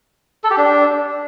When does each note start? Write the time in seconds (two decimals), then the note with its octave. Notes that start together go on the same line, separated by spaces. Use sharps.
0.44 A4
0.51 G4
0.57 D4